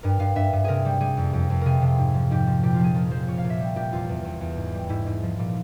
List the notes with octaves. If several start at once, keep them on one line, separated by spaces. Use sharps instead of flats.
G2 A#4
G2 F5
G2 E5
G2
C3 G#4 A#4
G3
G3 G#4
F2
F2
F2
C3 G#4 A#4
C3
G#2
F3
G#2 G4
F3
A#2 G4
F4
F3 G#4
F3 A#4
F3 C5
A#2 C#5
F5
A#2
E5
G3
A#2 G4
E2 F4
E2
E2
E2
G#2
G3
G#2 E4
G#2
F3
A#2